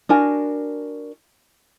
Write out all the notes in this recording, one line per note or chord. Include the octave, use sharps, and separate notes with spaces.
D4 F#4 A#4 G#5